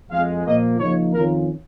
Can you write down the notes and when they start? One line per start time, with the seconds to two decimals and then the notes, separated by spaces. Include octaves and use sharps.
0.10 F2 F3 G#3 F5
0.45 A#2 F3 A#3 D#5
0.79 C#3 F3 A#3 D#4 C#5
1.14 F2 D#3 C#4 F4 A#4